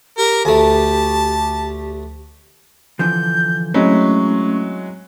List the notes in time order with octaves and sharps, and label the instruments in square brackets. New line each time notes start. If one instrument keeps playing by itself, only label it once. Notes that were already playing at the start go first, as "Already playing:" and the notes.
[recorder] G4 [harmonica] A#4
[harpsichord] D2 A3 [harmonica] A5
[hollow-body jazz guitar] D3 E3 F3 [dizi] G6
[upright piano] F#3 G#3 [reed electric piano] A3 C4 C#4 [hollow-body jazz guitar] E4 [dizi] C#6